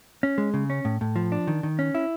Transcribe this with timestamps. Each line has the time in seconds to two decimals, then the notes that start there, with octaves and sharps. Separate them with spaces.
0.23 C#4
0.38 G#3
0.54 C#3
0.70 C#4
0.85 A2
1.01 A2
1.16 F3
1.32 D4
1.47 D#3
1.63 D#3
1.79 C#4
1.95 E4